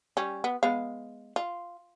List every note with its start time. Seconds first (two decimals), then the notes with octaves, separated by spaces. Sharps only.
0.17 G3 C#4
0.44 B3
0.63 G#3 B3 F5
1.36 F4